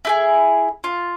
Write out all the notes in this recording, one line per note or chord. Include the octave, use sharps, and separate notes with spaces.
E4 G4 G#4
F4